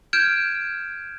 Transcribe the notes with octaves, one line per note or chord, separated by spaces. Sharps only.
F6 G6 G#6 D7 E7